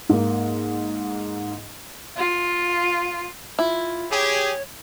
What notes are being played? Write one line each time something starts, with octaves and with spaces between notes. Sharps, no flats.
G#2 A#3
F4
E4 F4
G4 G#4 C#5